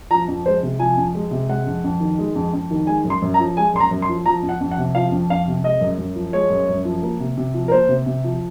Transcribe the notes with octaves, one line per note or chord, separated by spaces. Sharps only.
F3 A#5
F2
G#3 C5
C3
F3 G#5
F2
G#3
C3
G#3 F#5
F2
F2
D#3
G#3
F2
F2
D#3
G#3 G#5
F#2
C6
F#2
A#5
F3
G#3 G#5
F#2 C6
A#5
F#2
C6
F3
F3 A#5
F2
F#5
F2
F#5
C3
F3 F5
F2
F2 F5
C3
G#3 D#5
F#2
F#2
F3
G#3 C#5
F#2
F#2
F3
A#3
C3
C3
F3
A#4
A#3 C5
C3
C3
F3